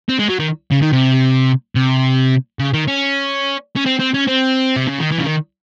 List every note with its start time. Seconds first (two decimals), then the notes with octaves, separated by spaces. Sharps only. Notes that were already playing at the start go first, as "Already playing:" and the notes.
0.09 C4
0.19 G#3
0.29 F#3
0.40 D#3
0.71 C#3
0.82 D#3
0.92 C3
1.75 C3
2.59 C#3
2.74 D#3
2.88 C#4
3.76 C#4
3.86 C4
3.99 C4
4.14 C#4
4.27 C4
4.77 C3
4.88 C#3
5.00 D#3
5.12 E3
5.18 C#3
5.25 D#3